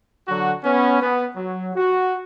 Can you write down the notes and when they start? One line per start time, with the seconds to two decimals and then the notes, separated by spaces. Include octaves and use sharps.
0.28 D3 F#3 F#4
0.64 B3 C#4
1.02 B3
1.36 F#3
1.75 F#4